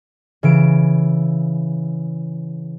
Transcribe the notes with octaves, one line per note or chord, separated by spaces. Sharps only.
C#3 E3 D7